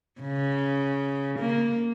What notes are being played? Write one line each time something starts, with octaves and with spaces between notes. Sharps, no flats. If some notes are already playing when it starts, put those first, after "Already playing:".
C#3
A#3